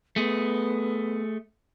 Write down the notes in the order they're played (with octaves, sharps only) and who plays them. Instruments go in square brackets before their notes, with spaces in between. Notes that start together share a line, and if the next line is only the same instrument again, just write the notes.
[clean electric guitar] A3 G#4 [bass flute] B3